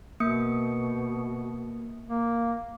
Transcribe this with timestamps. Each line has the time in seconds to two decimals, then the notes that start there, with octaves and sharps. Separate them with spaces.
0.20 B2 A#3 D#6 C#7
2.09 A#3